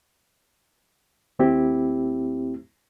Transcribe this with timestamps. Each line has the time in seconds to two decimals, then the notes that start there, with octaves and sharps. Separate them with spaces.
1.39 D#2 A3 C4 E4 G4